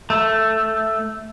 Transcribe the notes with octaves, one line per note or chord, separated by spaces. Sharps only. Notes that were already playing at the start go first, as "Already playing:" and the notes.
A3